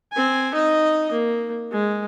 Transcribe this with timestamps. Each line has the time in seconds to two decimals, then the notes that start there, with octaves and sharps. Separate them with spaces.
0.12 C4 G#5
0.54 D#4 D#5
1.12 A#3
1.72 G#3